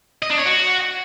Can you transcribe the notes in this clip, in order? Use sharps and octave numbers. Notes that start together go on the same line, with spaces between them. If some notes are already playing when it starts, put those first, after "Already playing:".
D#5
D4
C#5
F#4